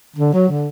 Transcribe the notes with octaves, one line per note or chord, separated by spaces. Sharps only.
D3
F#3
D3